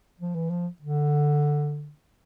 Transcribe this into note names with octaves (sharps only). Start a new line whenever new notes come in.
F3
E3
F3
D3